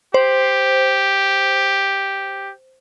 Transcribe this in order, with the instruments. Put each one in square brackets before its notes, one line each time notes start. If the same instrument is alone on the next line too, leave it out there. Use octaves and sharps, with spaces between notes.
[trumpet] G4 [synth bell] C5